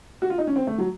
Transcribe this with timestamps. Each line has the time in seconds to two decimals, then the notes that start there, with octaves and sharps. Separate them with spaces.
0.22 F#4
0.30 F4
0.38 D#4
0.47 C#4
0.56 C4
0.67 A3
0.78 F#3